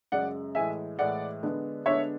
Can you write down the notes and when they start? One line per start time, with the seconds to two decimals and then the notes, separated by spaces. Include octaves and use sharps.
0.12 F#2 C#3 G#3 D5 F#5
0.55 A2 E3 G#3 E5 G#5
0.99 A2 E3 G#3 D5 F#5
1.43 D3 G#3 B3 D4
1.86 D3 G#3 B3 D4 C#5 E5